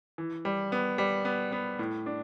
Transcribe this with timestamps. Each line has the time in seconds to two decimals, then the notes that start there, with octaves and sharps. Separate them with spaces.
0.18 E3
0.45 G3
0.72 B3
0.98 G3
1.25 B3
1.52 B3
1.79 A2
2.06 D4